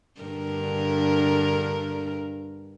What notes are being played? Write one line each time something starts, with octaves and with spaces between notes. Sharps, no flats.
G2 D3 A#4